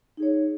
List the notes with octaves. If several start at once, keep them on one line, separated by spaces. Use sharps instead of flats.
D#4 G#4 C#5